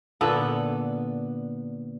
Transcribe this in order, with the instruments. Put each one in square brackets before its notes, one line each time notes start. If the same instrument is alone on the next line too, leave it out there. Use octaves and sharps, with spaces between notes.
[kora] A#2 D3 B3 A4